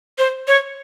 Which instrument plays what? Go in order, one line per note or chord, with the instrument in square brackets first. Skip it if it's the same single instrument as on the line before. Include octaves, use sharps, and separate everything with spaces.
[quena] C5
C#5